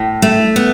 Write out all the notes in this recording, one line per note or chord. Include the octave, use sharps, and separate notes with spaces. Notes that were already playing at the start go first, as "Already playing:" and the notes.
Already playing: A2
A3
B3